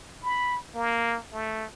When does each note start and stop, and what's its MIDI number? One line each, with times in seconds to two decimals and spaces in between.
0.23 0.58 83
0.75 1.19 58
1.33 1.65 57